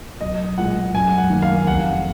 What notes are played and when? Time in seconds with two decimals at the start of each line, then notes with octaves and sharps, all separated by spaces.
0.21 B1 D#5
0.57 A#2 G#3 F#5
0.95 F#2 G#5
1.18 F#5
1.30 D#3 A#3
1.42 F5
1.67 F1 F#5